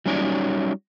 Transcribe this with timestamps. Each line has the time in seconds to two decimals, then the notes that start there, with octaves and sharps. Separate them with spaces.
0.06 F#3 G3 C#4 D#4 C#5 D5